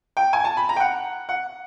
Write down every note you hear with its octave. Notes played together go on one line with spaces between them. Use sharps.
G5
G#5
A5
B5
A#5
G5
F#5
F#5